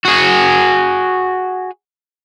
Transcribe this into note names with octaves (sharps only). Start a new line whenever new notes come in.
F#4 G#4